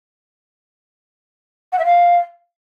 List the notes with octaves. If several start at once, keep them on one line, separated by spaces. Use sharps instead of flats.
F#5
E5
F5